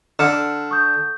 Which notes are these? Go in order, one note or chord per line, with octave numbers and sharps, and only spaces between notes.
D3 F6 C#7 E7
C#6 D#6 G6